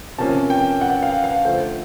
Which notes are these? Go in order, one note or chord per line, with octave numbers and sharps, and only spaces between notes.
C3 F3 A#3 C#4 A5
G5
F#5
F5
F5
D3 F3 A3 C5